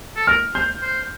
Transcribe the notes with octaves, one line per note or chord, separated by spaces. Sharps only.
A4
A#4 F6
C5 G6
C5